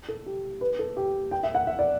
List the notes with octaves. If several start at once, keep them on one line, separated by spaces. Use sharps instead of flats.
A4
G4
B4
A4
G4
G5
E5
F#5
E5
D5